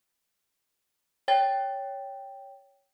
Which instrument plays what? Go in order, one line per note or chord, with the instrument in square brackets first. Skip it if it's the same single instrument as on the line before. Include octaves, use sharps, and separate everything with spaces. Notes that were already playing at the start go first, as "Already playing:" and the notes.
[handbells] C#5 G5 A6